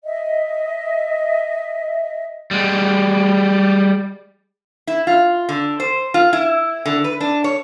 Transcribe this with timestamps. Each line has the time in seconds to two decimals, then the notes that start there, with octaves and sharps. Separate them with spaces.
0.04 D#5 E5
2.51 G3 G#3
4.87 E4
5.07 F4
5.49 D3
5.80 C5
6.14 F4
6.33 E4
6.86 D3
7.04 B4
7.20 D4
7.44 C#5